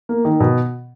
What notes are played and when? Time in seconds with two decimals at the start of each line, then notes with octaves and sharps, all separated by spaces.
0.09 A#3
0.25 D#3
0.40 B2